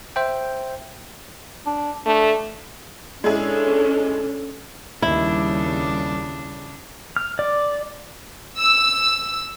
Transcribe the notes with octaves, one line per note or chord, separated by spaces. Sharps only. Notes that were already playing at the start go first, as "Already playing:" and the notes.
C5 E5 G5
D4
A3 D4
G#3 C#4 D4 E4 G#4 A4
D#2 C#3 G3 D4 E4
F6
D5
E6